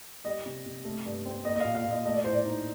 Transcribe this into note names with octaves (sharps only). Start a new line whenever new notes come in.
G3 D#5
C3
C3
A3
G2
C4
A#3 D#5
D#5
A#2 F5
F5
A#2
D#5
A3 D#5
D5
A2 C5
D5
D#4